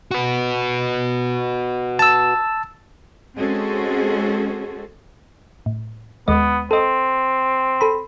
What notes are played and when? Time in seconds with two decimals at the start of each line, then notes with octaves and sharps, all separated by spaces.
0.11 F#4 B4
1.99 A5 E6
3.36 G#3 C4 C#4 F#4 G#4 A4
5.66 A2
6.28 D#2 G#3 B3 D#5
6.71 C4 A4 D#5
7.81 A4 B5